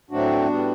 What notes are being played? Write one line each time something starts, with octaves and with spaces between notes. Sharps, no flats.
A2 F#3 A3 C4 D4 F#4
A2 G3 B3